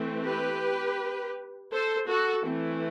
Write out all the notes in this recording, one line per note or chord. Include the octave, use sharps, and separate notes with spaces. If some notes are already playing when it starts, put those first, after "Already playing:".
Already playing: E3 A3 C4
G4 B4
A4 C5
F#4 A4
E3 A3 C4